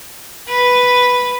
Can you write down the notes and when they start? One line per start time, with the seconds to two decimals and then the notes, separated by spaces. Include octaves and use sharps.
0.49 B4